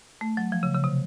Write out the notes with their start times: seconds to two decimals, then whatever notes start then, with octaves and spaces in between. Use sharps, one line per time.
0.21 A3
0.37 F#3
0.52 F3
0.63 C#3
0.74 C#3
0.84 C3